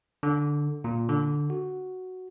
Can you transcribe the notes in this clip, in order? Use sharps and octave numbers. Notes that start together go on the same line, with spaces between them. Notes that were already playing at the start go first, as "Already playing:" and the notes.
D3
A#2
D3
F#4